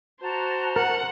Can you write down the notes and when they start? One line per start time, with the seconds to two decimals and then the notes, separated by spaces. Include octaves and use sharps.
0.21 F#4 C5 A5 A#5
0.76 A#4 F#5